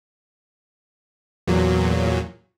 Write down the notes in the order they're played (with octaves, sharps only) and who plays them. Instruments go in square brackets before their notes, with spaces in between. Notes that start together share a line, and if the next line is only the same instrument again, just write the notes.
[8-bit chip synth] E2 A#2 F#3